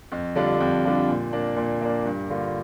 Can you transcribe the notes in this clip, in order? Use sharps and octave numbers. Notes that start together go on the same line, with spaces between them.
F2
D3 G3 D4 F4
F2
D3 G3 D4 F4
A#2
A#3 D4
A#2
A#3 D4
G2
D3 A#3 F4